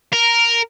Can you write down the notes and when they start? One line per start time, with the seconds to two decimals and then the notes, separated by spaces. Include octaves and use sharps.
0.13 A#4